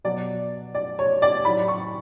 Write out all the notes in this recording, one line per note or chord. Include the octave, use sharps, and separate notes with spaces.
B2 F#3 D5
D5
C#5
D5
A2 F#3 B5
C#6